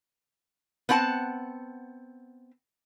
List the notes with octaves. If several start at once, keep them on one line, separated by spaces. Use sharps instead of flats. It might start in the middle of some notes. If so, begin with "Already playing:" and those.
B3 C4 F#5 A5